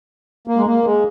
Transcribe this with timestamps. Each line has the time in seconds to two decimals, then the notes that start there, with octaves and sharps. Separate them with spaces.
0.47 A#3
0.57 G#3
0.66 A#3
0.84 G#3